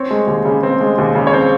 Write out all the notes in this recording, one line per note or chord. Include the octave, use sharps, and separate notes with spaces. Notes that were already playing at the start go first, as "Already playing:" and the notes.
Already playing: C4 C#5
G#3
D#2
C#3
C4
G#3
D#2
C#3
C#5
C4 C5